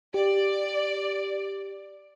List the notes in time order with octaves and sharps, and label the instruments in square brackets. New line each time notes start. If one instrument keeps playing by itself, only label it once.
[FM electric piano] G4 [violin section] D5